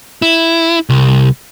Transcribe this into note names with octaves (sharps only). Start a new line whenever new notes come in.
E4
C2